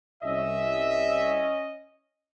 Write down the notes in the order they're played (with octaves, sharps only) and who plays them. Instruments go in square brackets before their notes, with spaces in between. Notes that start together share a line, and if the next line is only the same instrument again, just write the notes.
[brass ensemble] C2 E5 [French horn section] C#4 D#5